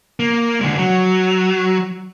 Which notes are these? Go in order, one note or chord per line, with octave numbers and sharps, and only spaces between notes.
A#3
D3 G#3
F#3